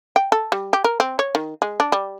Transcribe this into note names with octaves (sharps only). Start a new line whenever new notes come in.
G5
A4
G3
G4
A#4
C4
C#5
D#3
G#3
D4
G3